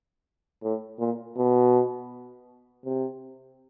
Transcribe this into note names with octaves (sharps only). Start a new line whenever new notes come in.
A2
A#2
B2
C3